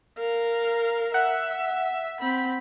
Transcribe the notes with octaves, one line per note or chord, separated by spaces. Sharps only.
A#4 F5
E5 F#5
C4 B5